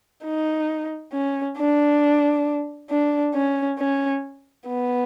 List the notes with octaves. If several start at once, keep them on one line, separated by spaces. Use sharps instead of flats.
D#4
C#4
D4
D4
C#4
C#4
B3